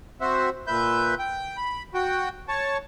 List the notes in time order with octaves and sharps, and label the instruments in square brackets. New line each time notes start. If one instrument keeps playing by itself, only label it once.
[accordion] C4 F#4 C5 E5
A#2 B4 E5 G6
G5
B5
F#4 G5
C#5 A5